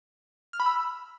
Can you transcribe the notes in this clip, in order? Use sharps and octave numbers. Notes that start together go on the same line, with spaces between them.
F6
B5
E6